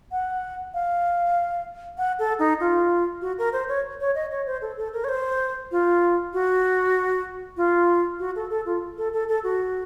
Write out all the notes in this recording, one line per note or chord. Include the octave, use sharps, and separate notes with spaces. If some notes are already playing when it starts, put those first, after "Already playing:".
F#5
F5
F#5
A4
D#4
F4
F#4
A#4
C5
C#5
C#5
D#5
C#5
C5
A4
A4
A#4
C#5
C5
F4
F#4
F4
F#4
A4
A4
F4
A4
A4
A4
F#4